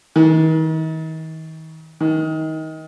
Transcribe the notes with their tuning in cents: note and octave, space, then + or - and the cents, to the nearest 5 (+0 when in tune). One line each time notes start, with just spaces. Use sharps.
D#3 +40
D#3 +25